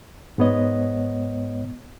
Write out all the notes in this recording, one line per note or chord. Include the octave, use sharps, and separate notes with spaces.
G#2 G#3 B3 C#5 D#5